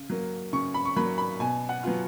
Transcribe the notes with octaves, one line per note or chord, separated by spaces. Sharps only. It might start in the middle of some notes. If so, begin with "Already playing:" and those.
Already playing: C#3
F#3 A#3
C#3 C#6
B5
C#6
F#3 A#3 B5
B5
B2 G#5
F#5
F#3 B3 F4